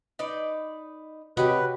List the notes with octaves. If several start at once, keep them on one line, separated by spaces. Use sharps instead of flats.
D#4 B4 D5
C3 F#4 G4 B4 C#5 D#5